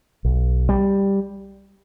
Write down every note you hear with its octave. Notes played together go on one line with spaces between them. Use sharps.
B1
G3